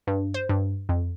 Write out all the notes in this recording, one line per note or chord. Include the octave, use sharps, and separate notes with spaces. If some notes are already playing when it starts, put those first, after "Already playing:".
G2
C5
G2
F2